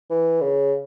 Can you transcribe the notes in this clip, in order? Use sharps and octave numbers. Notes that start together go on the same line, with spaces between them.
E3
C#3